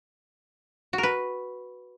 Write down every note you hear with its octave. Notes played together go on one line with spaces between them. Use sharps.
F#4
A#4
B4